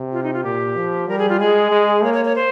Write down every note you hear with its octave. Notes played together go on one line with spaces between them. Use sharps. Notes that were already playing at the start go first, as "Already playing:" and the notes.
Already playing: C3
F4
D#4
F4
A#2 G4
F3
G3 A#4
G#4
F4
G#3 G#4
G#3
A#3 C#5
C#5
C#5
C5